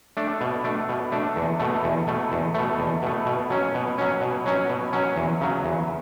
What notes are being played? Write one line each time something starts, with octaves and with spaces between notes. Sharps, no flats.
A3 D4
B2
A3 D4
B2
A3 D4
E2
B2 A3
E2
B2 A3
E2
B2 A3
E2
B2 A3
B2
F#3 C#4
B2
F#3 C#4
B2
F#3 C#4
B2
F#3 C#4
E2
C#3 F#3
E2